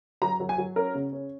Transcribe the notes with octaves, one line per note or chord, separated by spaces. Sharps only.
F#3 A#5
F#3
G#5
F#3
C#4 A#4
C#3
C#4